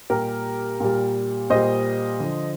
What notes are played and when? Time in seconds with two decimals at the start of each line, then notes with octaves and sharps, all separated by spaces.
0.10 A#2 G3 G4 A#4
0.80 A#2 G3
1.50 A#2 G3 C5 D#5
2.20 D3 F3